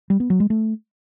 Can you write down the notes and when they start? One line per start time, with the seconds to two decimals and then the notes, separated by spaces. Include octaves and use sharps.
0.10 G3
0.20 B3
0.30 F#3
0.40 G#3
0.50 A3